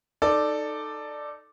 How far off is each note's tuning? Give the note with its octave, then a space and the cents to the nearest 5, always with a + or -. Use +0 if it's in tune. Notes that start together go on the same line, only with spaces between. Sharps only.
D#4 -10 A4 +0 D5 +5